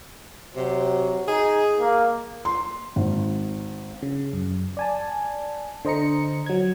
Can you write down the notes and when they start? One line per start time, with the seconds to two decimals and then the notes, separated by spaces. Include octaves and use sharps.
0.56 C3 F#3
1.28 D#4 G#4
1.80 A#3
2.45 C6
2.96 G#1
4.02 C#3
4.33 F#2
4.77 D5 G#5 A5
5.85 D3 C5 D#5 A#5 C#7
6.46 F#3 G#6